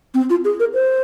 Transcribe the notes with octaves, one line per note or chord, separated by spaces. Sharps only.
C4
F4
G#4
A#4
C5